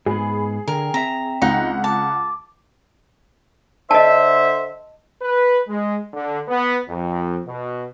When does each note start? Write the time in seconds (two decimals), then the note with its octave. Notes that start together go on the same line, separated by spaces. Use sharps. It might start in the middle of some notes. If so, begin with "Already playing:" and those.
0.06 G#2 B3 G#4 B5
0.68 D3 A#4 G5
0.94 C4 E5 A#5
1.42 C#2 D#4 F#5
1.84 A5 D6
3.91 D3 C5 D#5 E5 A5
5.22 B4
5.67 G#3
6.13 D3
6.48 B3
6.89 F2
7.47 B2